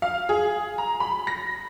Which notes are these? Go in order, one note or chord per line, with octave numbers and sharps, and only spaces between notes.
F5
G#4
A#5
B5
A#6